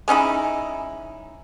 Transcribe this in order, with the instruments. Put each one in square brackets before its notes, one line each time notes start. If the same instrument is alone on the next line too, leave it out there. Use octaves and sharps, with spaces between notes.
[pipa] G#3 C#4 D#4 E4